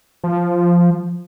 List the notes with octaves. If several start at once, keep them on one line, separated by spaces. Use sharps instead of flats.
F3